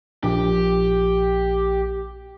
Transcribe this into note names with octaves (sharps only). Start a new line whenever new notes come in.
A#1 G4